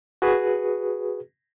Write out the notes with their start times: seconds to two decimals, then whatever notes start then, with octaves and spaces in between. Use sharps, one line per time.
0.22 F#4 G#4 B4